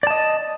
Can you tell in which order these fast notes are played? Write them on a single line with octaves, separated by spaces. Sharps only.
D5 A5 D#5